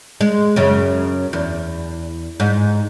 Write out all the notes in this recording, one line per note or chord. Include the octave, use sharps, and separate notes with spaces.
G#3
F#2 C#3
E2
G#2